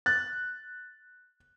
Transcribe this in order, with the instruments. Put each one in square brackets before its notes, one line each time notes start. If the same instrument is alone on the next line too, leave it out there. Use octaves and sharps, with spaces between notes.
[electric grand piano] F#6 A6